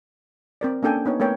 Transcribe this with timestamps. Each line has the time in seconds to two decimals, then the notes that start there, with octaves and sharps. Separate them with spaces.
0.61 C4 A#4 D5
0.83 A#3 C#4 D4 A4 G5 G#5
1.06 B3 D#4 C#5
1.20 A3 B3 A#4 C#5 G5